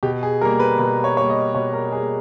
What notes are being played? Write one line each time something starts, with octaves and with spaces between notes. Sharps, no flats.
B2 G4
G#4
G3 A#3 A#4
B4
B2 B4
C#5
G3 A#3 C#5
D#5
B2 C#5
A#4
G3 A#3 G#4